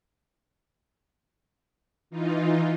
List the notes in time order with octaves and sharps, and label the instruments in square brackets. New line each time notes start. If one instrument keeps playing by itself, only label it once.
[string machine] E3 D#4 F4